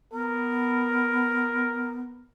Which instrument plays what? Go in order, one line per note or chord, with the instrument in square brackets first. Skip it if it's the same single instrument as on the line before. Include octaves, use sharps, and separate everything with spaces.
[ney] B3 [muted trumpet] A#4